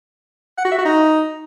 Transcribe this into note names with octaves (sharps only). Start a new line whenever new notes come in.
F#5
F#4
E5
F#4
D#4